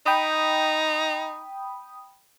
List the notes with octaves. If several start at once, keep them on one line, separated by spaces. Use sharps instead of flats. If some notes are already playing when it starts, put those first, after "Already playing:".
D#4 G5 B5 D#6